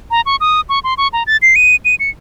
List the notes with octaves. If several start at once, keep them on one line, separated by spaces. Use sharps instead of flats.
A#5
C#6
D#6
C#6
C6
C#6
A#5
A6
C7
D#7
D#7
C#7